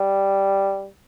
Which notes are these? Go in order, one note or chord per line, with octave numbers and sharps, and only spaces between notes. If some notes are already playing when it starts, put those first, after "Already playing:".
Already playing: G3